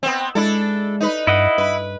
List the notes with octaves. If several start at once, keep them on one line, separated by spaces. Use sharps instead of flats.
B3 C4
G#3 D4 E4 A4
D#4 B4
G2 E4 D#5 F#5
G2 B4